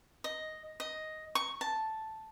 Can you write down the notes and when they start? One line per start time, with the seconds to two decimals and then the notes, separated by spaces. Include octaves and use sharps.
0.24 D#5
0.80 D#5
1.35 C#6
1.61 A5